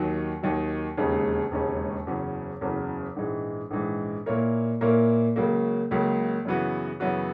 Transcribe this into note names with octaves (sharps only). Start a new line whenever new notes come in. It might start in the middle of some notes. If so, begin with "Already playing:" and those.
Already playing: D#2 D#3 F#3
D#2 D#3 F#3
E1 D#2 C#3 G#3 C#4
E1 D#2 C#3 G#3 C#4
F#1 E2 C#3 F#3 C#4
F#1 E2 C#3 F#3 C#4
A#1 G#2 E3 G#3
A#1 G#2 E3 G#3
A#2 A#3 E4 A#4 C#5
A#2 A#3 E4 A#4 C#5
C#2 C#3 F#3 A#3
C#2 C#3 F#3 A#3
F#2 C#3 E3 B3 F#4
F#2 C#3 E3 B3 F#4